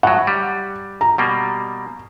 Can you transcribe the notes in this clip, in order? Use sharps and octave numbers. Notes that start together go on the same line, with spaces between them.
A2 F#3 F#5
G3
A#5
B2 G3 A#3